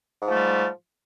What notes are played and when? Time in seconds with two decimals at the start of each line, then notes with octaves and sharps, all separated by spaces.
0.22 G#2
0.27 F3
0.31 A3
0.35 G3